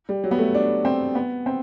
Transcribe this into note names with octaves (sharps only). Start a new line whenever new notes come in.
G3
F#3
B3
A3
D4
C4
B3
C4